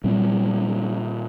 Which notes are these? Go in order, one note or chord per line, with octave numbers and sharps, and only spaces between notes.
A#2 G3 C4